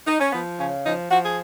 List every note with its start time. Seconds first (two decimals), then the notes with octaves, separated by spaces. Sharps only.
0.06 D#4
0.19 C#4
0.32 F3 B3
0.58 C#3 C#4
0.84 F3 D#4
1.10 F3 F#4
1.25 G#4